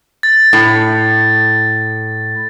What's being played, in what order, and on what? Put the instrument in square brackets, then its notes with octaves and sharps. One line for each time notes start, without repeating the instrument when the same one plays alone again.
[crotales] A6
[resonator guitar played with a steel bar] A2